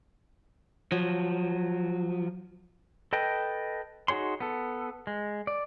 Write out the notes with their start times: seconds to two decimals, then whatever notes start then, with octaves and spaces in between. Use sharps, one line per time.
0.92 F3 F#3
3.13 A4 B4 D#5 G5
4.08 D#4 F#4 G#4 C#5 C6
4.40 B3 A4
5.07 G#3
5.47 D5